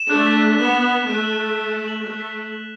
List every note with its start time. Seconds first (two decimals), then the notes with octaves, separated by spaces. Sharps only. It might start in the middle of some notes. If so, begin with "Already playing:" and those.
Already playing: E7
0.09 A3 D4 F#6
0.27 B6
0.43 F#6
0.58 B3 E7
0.74 F#6
0.91 B6
1.07 A3 F#6
1.24 F#7
1.40 F#6
1.55 B6
1.72 F#6
1.88 F#7
2.04 A3 F#6
2.20 B6
2.36 F#6
2.52 F#7